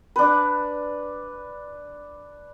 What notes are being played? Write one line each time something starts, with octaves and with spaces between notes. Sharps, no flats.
D4 B4